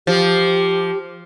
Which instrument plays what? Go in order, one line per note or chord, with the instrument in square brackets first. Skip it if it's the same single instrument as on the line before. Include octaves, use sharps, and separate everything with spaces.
[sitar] F3 [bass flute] G4